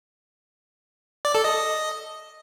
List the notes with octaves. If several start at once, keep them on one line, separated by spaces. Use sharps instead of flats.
D5
A4
D#5